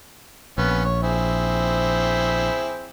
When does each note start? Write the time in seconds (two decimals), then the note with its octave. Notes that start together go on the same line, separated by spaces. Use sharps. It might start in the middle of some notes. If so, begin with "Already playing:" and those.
0.58 A#1 B3 C#4
0.85 C#5
1.03 C4 E4 G#4